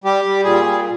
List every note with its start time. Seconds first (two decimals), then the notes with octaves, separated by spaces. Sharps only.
0.04 G3 G4
0.25 G3
0.44 A#2 G#4
0.65 G3